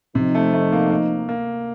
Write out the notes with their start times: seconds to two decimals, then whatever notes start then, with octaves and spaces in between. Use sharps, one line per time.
0.15 C3 F3 C4 D#4
0.35 A3
0.53 A3
0.73 A#3
0.91 A#3
1.29 A#3